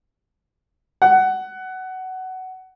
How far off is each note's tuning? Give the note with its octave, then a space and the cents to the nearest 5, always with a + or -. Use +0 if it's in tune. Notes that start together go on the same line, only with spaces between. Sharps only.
F#5 +15